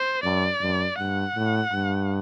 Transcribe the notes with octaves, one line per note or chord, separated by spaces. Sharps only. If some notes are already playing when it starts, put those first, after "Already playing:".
Already playing: C5
F#2 D5
F#2
G2 F#5
A2
G2